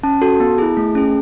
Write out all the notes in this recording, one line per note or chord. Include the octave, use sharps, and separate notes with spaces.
C#4 A5
F#4 A4
B3
E4 G#4
A3
C#4 G#4